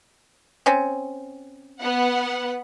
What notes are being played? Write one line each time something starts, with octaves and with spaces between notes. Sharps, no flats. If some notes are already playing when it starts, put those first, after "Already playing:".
C4 C#4
B3 F#5